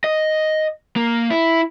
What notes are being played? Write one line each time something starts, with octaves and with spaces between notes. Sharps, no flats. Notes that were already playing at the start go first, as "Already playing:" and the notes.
D#5
A#3
E4